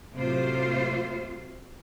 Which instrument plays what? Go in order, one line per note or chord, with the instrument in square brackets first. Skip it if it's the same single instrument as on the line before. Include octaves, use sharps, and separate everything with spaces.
[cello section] A2 C3 F#3 F4 C5